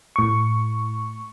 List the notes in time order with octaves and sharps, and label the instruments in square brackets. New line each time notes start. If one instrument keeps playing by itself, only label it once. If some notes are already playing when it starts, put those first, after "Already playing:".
[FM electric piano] A2 C#6